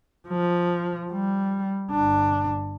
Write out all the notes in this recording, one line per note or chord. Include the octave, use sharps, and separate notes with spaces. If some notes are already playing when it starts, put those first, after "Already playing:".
F3
G3
G1 D4